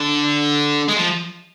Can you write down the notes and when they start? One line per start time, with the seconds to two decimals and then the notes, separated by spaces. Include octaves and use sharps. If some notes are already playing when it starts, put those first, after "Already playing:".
Already playing: D3
0.88 G#3
0.97 F3